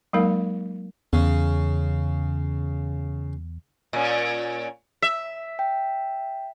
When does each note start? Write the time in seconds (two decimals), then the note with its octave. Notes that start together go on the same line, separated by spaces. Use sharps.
0.13 F#3 G#3 A#3 D#4 A#4 F5
1.13 E2 C#3
3.93 A#2 C#4
5.02 E5
5.59 G5